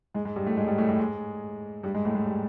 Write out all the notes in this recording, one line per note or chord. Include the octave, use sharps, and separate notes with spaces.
G#2 G#3
G#2 G#3
G2 G3
A2 A3
G#2 G#3
G2 G3
A2 A3
A2 A3
G#2 G#3
G2 G3
G#2 G#3
A2 A3
G#2 G#3
G3